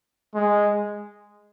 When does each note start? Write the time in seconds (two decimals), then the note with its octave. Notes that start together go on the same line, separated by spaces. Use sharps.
0.35 G#3